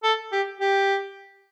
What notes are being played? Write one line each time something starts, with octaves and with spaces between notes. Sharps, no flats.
A4
G4
G4